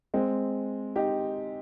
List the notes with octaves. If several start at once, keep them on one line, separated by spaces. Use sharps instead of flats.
G#3 C4
D#4 G4